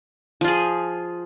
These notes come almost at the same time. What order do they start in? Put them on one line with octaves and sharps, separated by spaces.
F3 F4 G#4